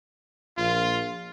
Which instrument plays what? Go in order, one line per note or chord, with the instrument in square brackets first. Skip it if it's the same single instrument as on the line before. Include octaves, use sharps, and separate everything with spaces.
[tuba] A#1 [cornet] F4